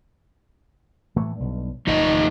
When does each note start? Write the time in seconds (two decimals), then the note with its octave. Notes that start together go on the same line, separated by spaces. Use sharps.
1.16 A2 E3 A3
1.36 B1 G2
1.87 G#1 F2 D#3 D#4 D#5